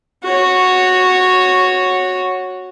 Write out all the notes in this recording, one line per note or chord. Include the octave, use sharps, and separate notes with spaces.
F#4 C#5